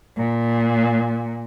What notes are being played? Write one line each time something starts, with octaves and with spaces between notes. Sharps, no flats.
A#2